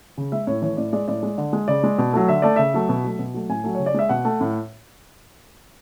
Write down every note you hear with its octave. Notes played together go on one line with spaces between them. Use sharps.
C#3
G#3 E5
A2 C#5
E3 A3 C#5
A2 D5
G#3 D5
A2 D5
G#3
D3
G#3
C#3 D5
G#3
B2
F#3 A3
D3 E5
A3 D5
C#3 E5
F#3 A3
B2
F#3 A3
B2
F#3 A3
A2 G#5
F#3 A3
C#3 C#5
D5
G#3 E5
B2 F#5
A3
A2